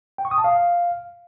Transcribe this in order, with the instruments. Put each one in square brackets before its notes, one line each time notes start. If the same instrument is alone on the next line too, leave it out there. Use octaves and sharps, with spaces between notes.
[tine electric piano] G5
C#6
D#6
A5
F5